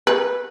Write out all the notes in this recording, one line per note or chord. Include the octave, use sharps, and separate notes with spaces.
B4